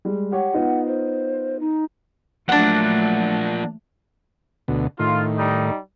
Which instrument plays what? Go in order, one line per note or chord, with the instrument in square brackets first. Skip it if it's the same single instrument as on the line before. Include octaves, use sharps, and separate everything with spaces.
[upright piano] G3 G#3
[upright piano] G4 C#5 [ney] F#5
[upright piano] B3 D#4 F4
[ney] C5
D#4
[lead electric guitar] F3 A#3 [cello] F#3 A3 [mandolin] D4 F#5
[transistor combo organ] D2 B2
[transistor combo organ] A2 D#3 [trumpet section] F4
[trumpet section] G3 D#4